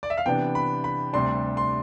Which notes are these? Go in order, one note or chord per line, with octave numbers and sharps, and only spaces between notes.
D5
E5
F5
C3 E3 B3 D4 G5
B5
B5
D2 C3 G3 D4 C6
C6